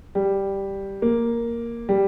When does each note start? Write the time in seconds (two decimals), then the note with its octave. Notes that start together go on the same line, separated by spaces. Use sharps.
0.15 G3
1.02 A#3
1.89 G3